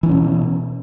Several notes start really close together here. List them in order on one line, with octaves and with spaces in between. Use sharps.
E3 D4 C#4 B2